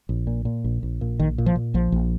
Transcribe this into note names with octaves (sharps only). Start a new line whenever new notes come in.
A#1
A#2
A#2
A#1
A#1
A#2
A#1 D#3
A#2
F3
A#2
A#1 F3
A#1